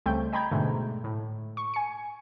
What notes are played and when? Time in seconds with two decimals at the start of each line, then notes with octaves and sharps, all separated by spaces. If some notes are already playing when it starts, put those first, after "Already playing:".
0.06 C#2 G3 A3 C4 G5 G6
0.33 D#5 G5 A#5 B5 G6 G#6
0.51 G#2 B2 D3 G#3 A3
1.04 A2
1.57 C#6
1.74 G#5 C#7